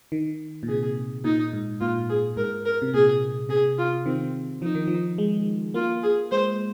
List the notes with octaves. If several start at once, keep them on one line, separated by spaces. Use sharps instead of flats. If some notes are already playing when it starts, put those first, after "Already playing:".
D#3
A#2
C3 G#4
A#2 D#4
G#2
A#2 F4
G#4
G#2 A#4
A#4
C3
A#2 G#4
C3 G#4
F4
D#3 C4
F3 D#4
D#3
F3
G#3
A#3 F4
G#4
G#3 C5